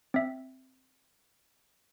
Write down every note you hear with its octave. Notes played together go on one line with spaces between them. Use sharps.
C4 E5